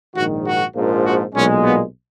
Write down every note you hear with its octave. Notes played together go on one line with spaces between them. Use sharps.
A#1 G#2 D#3 F#4
F#4
A#1 G#2 F3 A#3
F#4
B1 A#2 G#3 C#4
B3